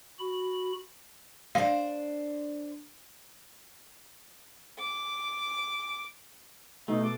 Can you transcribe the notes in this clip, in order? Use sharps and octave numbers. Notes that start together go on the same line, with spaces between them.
F#4 B5
D4 C5 F5
D6
B2 A3 D#4
A4 D6